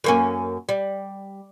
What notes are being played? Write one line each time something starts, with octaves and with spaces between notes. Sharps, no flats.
F#2 A#3 C#4
G3